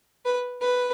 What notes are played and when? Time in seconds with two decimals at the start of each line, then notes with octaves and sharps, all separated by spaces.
0.25 B4
0.61 B4